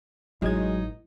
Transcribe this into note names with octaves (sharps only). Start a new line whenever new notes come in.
A1 F#3 G#3 D#4 G#6